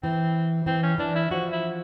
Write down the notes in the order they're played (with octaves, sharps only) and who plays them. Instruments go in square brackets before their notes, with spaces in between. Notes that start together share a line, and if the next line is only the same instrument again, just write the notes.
[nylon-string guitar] E3 [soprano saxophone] C4
[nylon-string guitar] E3 [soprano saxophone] C4
[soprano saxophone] C#4
[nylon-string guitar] E3 [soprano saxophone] D4
[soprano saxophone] E4
[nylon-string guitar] F3 [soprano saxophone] F#4
[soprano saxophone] E4